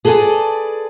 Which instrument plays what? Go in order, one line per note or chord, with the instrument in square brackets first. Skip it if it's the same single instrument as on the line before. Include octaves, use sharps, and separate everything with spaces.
[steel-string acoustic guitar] G#4 A4 B4 C5 D5 G#5